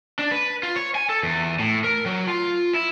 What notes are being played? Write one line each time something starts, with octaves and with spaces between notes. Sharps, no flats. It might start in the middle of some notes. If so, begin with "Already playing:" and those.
D4
B4
F4
C#5
G#5
A4
E2
A2
A#4
F#3
F4
E4